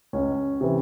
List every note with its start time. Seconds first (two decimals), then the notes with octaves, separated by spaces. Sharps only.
0.13 C#2 C#4
0.61 C3 E3